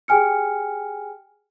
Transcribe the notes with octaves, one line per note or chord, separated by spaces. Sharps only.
G4 G#4 G5 G#5 F6 C#7